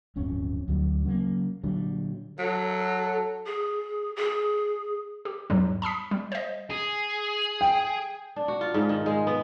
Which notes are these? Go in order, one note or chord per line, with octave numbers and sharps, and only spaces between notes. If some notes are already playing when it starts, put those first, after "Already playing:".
D1 G1 F2 C#4
D2 F#3 G3
C#3 F#3 A3 A#3
A#2 D3 F#3 G3
F#3 A4
G#4
G#4
G4
E2 G#2 F#3 G3
A5 B5 D#6 B6
G3
C5 D#5
G#4
G5
D4
F#4
F4
G#2
D#3
G#3
B3